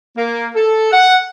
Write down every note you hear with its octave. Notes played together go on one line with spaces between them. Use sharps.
A#3
A4
F#5